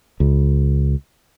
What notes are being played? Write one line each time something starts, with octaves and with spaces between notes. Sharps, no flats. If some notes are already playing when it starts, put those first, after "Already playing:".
C#2